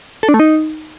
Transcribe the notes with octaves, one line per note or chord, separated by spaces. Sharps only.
A4
D4
A3
D#4